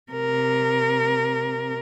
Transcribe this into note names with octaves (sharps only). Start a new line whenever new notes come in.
C3 A#4